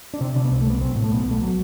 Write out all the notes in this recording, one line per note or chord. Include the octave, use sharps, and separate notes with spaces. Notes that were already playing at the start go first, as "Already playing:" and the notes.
D4
C3 C4
C3 D4
B3
C2 C4
A3
C2 B3
B1 C4
A2
A3
B1 B3
B3
B1
A3
F#3